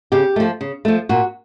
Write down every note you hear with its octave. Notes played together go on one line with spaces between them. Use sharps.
C#3 G4
F3 A3
C#3
F3 A3
A#2 F#4